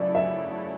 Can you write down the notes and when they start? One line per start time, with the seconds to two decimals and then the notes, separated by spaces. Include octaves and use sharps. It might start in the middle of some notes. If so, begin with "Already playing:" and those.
Already playing: C#3 F#3 A3 E4 D5
0.15 E5